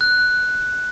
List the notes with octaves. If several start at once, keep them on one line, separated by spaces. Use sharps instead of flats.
F#6